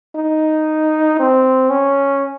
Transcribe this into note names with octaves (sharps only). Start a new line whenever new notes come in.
D#4
C4
C#4